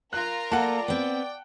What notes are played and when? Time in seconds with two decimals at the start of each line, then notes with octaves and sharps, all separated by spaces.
0.13 F4 A#4 A#5 F#6
0.52 A#3 A4 D5 F#5 A5
0.88 B3 C4 G5